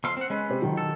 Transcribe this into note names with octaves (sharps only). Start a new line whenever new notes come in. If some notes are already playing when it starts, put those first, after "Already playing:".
F2 F5 C6 E6
C4 F#5
G#3 C#4 B4
C3 G4 C5
F2 D#3 F#3
A4